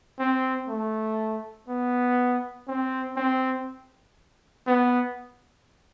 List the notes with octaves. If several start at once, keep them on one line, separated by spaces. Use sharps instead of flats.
C4
A3
B3
C4
C4
B3